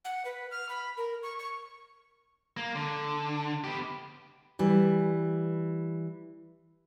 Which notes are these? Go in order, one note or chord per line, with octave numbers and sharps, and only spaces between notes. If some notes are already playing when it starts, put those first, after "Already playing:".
F#5
B4
F6
B5
A#4
C#6
C#6
A#3
D3
B3 G4
E3 G3